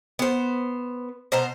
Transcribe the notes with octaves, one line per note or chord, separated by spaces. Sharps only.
B3 C5
B2 C5 A5 A#5